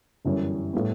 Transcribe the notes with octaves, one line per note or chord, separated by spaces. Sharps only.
G1 F#2 E3 G3 C#4
A2 G3 B3